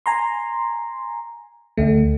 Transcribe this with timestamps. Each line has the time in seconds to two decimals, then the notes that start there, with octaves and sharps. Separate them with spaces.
0.06 G#5 A#5 C6
1.77 D2 A3